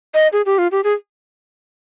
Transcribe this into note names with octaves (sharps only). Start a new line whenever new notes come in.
D#5
G#4
G4
F4
G4
G#4